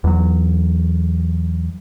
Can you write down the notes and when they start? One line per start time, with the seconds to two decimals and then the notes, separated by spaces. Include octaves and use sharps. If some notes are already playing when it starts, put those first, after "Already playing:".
0.04 E2 F#3